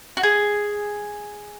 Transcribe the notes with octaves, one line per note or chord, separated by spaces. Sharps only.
F#4
G#4